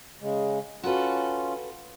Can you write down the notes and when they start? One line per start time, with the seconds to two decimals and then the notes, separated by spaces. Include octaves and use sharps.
0.21 C#3 G#3
0.84 C#4 F4 F#4 A4 B4